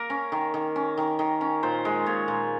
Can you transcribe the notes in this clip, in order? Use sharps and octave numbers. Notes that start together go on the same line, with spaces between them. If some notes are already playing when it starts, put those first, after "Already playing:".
Already playing: A#3 A#4
C#4
D#3
D#3
C#4
D#3
D#3
C#4
A#2 C5
G#3
A#2 C#5
A#2